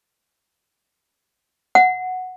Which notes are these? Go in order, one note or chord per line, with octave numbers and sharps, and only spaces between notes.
F#5